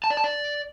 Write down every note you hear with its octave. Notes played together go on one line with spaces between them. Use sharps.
A5
D5
A5
D5